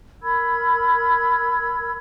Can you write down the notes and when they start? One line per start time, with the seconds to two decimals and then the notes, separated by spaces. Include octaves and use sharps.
0.22 A#4 B5 E6 G#6